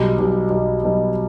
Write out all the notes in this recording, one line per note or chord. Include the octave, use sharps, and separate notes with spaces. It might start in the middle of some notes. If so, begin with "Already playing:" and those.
Already playing: B1 B2 G3
B1 B2 G3
B1 B2 G3
B1 B2 G3